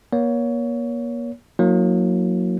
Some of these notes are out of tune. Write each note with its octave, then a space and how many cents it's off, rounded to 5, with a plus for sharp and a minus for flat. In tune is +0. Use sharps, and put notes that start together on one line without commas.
A#3 +40 C#5 +25
F#3 -20 A#3 +0 E4 -45